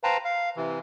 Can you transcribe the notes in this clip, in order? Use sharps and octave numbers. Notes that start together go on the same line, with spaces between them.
B4 C5 F5 G5 A5 A#5
F5
C3 E3